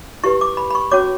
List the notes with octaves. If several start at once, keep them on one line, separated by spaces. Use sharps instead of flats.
E4 G4 B4 C#6
D6
B5
B5
C#6
C#4 F#4 C#5 D6